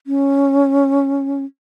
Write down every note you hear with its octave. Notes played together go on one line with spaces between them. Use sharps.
C#4